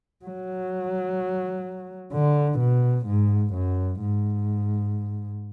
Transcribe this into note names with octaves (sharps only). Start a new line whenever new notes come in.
F#3
D3
B2
G#2
F#2
G#2